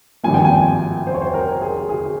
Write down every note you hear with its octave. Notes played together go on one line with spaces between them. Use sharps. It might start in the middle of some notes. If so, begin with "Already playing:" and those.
G#1 G2 F3 A#3 G#5
G5
G#5
C5
C#5
C5
A#4
G#4
G#4